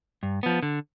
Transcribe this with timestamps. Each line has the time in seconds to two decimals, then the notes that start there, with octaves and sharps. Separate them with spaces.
0.23 G2
0.43 F3 B3
0.63 D3